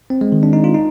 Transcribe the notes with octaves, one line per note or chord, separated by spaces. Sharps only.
C4
G#3
D#3
D4
D#4
F4
D#4